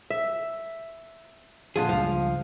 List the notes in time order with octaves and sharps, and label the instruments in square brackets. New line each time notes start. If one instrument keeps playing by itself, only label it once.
[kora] E5
[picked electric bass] A#2 F3 [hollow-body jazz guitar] D3 F4 G#4
[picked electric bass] C#2 G2 [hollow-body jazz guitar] F3 [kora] F5